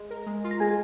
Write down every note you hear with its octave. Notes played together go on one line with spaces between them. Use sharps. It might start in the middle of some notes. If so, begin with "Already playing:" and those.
Already playing: G#3
A#4
G#3
F4
A#5
G#3 G#4 G#5